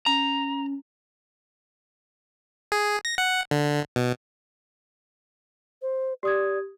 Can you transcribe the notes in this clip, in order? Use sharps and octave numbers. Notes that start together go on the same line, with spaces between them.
C#4 A#5
G#4
A#6
F#5
D3
B2
C5
G4 D5 D#6 G#6